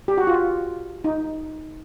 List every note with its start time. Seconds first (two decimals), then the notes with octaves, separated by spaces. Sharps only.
0.08 G4
0.18 F#4
0.27 F4
1.04 D#4